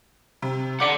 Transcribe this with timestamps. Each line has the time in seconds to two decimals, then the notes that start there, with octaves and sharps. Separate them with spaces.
0.42 C3
0.80 D5 F#5 D6 C#7